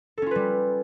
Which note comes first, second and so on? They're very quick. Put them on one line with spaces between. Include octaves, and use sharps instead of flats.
A4 C#4 F4 B4 G3